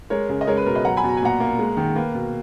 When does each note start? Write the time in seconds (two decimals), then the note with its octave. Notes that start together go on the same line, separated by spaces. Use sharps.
0.10 G#3 A#4 C#5
0.29 C#3
0.41 D#5
0.47 G#3 A#4 C#5
0.57 B4
0.66 B2 A#4
0.75 B4 D#5
0.85 F#3 F#5 A#5
0.97 G#5 B5
1.04 B2 A#5
1.17 G#5
1.22 A#2 F#5 A#5
1.40 A#3
1.59 G#3
1.77 D#3
1.96 A#3 B4
2.14 B2